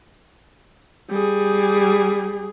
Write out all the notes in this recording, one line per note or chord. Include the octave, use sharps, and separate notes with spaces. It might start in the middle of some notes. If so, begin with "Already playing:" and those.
G3 G#4